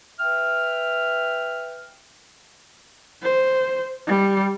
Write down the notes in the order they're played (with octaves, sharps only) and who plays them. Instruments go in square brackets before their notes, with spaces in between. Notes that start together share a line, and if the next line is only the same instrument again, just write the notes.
[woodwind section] B4 E5 G5 F6
[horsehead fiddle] C5
G3